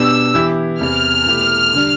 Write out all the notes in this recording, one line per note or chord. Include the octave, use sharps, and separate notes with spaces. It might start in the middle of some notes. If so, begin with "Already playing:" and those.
Already playing: B2 B3 D4 G4 E6
E3 B3 E4 G4
E2 C3 E3 B3 F6
B2 A3 E4 G4
D3 G3 D4